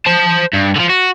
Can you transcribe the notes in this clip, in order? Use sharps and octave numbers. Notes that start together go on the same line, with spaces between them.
C5 A5
G2
D3 F3
F#4